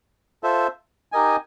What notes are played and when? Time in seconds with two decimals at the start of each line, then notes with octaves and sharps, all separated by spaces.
0.43 F4 A4 C5 E5
1.12 D#4 G4 A#4 D#5 G#5